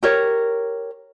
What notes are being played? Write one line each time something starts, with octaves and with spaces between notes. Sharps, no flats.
G4 A#4 C#5